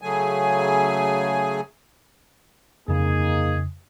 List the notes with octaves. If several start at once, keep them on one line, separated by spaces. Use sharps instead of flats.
C#3 F#3 A3 G#4 G#5
F2 C#3 A#3 D#4 G#4